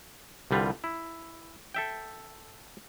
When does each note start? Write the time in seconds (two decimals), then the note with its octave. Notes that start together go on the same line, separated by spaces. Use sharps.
0.51 C2 D3 G3 F4 B4
0.84 E4
1.74 A4 E5 G5